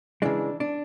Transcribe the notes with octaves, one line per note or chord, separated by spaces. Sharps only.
C#3 E3 G#3 D4
D4